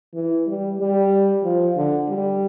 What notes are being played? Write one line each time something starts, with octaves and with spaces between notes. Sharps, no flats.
E3
G3
G3
F3
D3
G3